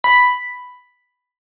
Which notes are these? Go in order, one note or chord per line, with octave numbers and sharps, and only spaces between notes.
B5